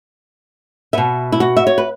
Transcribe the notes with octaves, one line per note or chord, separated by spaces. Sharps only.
B2 B3 E5
E4
F#4
E5
C#5
B4